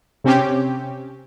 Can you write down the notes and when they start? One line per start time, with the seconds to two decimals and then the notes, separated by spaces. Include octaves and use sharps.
0.24 C3 C4 C#4 G4